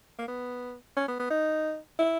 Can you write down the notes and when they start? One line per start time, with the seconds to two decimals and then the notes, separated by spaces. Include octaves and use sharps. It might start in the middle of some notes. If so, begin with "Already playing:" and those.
0.19 A#3
0.28 B3
0.96 C#4
1.08 B3
1.19 B3
1.30 D#4
1.99 E4